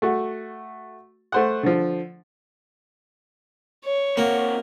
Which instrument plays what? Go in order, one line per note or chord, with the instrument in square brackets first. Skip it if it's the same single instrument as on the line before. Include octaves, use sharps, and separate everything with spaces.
[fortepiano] A3 F#4
A3 C5 F#5
D3 F3
[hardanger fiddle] C#5
[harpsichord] A#3 [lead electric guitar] C4 F#4